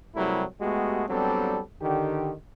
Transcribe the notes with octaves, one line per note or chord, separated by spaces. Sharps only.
C3 F#3 G3 A3 E4 A#4
G#3 A3 B3 F#4 G4
F#3 G3 B3 C4 D4 A4
D3 D#3 G4